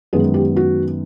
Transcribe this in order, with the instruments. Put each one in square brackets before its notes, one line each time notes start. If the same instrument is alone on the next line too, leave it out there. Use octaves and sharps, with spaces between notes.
[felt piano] F#2 D#3 G#3 B3 G#4
G4
F#4